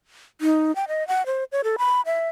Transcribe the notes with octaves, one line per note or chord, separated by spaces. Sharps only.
D#4
G5
D#5
F#5
C5
C#5
A4
B5
E5